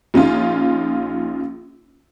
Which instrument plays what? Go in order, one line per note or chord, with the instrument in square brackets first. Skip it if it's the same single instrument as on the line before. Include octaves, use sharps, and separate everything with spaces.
[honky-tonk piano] A#1 C#4 D#4 F4